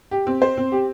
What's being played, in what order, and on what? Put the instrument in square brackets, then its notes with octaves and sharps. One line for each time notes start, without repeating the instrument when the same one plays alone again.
[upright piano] G4
C4
C5
C4
G4